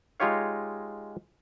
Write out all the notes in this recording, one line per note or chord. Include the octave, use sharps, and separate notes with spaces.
G#3 D#4 F4 G4 C#5 F5